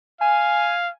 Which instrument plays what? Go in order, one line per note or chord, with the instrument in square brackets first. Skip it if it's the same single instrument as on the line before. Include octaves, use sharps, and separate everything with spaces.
[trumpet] F5 [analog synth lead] G#5